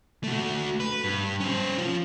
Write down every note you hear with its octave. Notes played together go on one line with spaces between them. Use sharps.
A3 F#4
B4
G2
C#4 C5
F3 F4